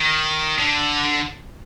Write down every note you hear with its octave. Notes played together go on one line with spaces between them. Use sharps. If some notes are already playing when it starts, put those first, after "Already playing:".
Already playing: D#3
D3